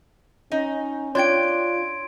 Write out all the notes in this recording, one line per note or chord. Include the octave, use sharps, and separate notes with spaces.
C#4 D#4
D4 F4 C#5 G5 C6 G#6 D7